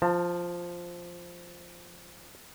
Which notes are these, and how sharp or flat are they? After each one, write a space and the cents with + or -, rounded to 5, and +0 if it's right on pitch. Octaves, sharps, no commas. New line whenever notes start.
F3 +0 A5 +25